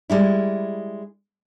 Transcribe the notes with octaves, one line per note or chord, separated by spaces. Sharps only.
G3 G#3 E4